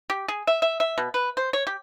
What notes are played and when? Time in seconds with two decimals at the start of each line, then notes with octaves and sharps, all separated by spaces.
0.10 G4
0.28 G#4
0.47 E5
0.62 E5
0.80 E5
0.98 B2
1.14 B4
1.37 C5
1.53 C#5
1.67 G4